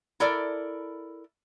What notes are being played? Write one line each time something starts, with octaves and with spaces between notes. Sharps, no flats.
E4 A4 A#4 D5